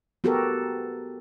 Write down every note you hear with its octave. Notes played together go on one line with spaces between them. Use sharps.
B3 F#4 G4 A4 A#4